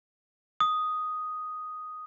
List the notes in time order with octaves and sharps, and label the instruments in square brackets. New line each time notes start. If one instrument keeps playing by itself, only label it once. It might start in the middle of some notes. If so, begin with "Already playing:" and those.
[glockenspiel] D#6